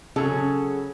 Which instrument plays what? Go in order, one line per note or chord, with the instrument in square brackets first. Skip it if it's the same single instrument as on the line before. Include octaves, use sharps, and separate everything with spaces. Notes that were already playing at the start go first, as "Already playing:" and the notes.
[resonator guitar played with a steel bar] C#3 F#3 C#4 G#4 A4